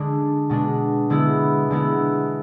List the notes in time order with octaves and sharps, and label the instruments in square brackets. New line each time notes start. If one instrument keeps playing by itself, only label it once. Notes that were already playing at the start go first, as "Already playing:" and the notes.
Already playing: [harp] D3 G#3 D4
B2 G#3 D4
D3 G#3 B3 E4
D3 G#3 B3 E4